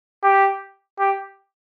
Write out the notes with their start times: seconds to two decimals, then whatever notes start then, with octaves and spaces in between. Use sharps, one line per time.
0.23 G4
0.99 G4